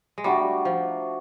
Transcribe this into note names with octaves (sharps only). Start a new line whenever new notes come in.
G#3
G3 A3 D4 F#4 A#4
F3